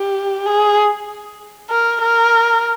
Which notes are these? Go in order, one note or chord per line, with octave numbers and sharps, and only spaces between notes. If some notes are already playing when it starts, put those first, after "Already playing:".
Already playing: G4
G#4
A#4
A#4